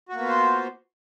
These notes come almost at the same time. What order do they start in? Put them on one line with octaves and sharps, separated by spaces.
F#4 A#3 B3 F4 C5